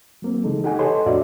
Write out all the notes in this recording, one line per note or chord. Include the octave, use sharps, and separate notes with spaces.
F#3 A#3 C4
C#3 E3 G#3 D#4 A4
D#4 G4 A4 F#5 G#5
A4 B4 C#5 D#5 B5 C6
F2 A2 D4 F#4 D5 E5